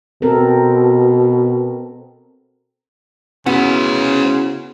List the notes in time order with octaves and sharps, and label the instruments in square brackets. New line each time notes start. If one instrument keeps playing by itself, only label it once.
[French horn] B2 [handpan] C4 A4 A#4
[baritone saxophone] C#3 [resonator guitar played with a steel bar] B3 [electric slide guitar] C#4 E4 F#4 [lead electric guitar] C5 F#5